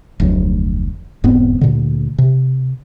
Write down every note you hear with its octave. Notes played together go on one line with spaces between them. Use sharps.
F1 D2 F#3
E1 G#2 B3 C4
D2 A#2 D3
C3